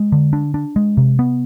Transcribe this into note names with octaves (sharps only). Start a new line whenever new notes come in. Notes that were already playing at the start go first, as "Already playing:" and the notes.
Already playing: G#3
D3
D4
D4
G#3
C3
B3